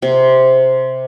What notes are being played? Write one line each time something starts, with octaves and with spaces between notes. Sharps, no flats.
C3